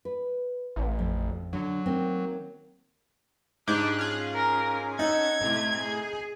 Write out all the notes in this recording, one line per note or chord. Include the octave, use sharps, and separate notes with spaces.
B4
A1
F2
D3 F#3
D#3 A#3 C4
G#2 D4 G4 G#4 F#6
C#4 F4 G#4
A#4
D#4 A4 F#5 G#6
A2 C3 A3
G#4